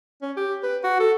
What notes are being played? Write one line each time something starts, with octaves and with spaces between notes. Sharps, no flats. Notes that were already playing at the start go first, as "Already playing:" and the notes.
C#4
G4
B4
F#4
A4